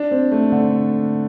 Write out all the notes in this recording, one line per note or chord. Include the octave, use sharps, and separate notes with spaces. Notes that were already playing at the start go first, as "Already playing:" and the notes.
Already playing: D4
C4
A3
D3